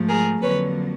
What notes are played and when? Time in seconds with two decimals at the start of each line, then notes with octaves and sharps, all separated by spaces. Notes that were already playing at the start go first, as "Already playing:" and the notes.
Already playing: G#2 F3 A3
0.08 G#4 A#4
0.42 F2 D3 F#3 A#3 B4 C#5